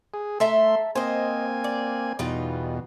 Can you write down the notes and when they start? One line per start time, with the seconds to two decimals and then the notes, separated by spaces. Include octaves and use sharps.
0.14 G#4
0.40 A3 A4 E5 A#5 C6
0.95 A#3 C4 C5 D#5 G#5
1.64 D5
2.19 E2 B2 G3 D#4 F4